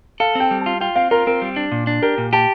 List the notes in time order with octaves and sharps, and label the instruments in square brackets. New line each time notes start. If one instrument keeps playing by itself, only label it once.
[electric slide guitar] A4 [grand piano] F5
[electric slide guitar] C4 [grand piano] G5
[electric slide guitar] G3
[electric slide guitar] F4 [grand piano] A5
[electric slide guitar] F4 [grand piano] G5
[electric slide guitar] C4 [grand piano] F5
[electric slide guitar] F4 [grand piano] A#4
[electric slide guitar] C4 [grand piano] A#4
[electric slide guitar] G3
D4
A#2
D4
[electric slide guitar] G4 [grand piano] A#4
[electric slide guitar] A#2
[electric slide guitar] G4 [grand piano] A5